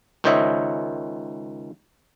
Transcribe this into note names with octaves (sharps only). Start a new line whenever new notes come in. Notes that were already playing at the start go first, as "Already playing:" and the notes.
C#2 D#3 C5 C#5 D#5 E5